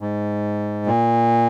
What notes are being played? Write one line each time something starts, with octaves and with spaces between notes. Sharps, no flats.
G#2
A#2